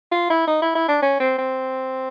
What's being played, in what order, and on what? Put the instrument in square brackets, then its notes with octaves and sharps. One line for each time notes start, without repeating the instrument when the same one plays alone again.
[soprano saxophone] F4
E4
D#4
E4
E4
D4
C#4
C4
C4